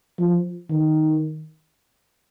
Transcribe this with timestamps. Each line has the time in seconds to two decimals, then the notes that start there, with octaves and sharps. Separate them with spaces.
0.19 F3
0.71 D#3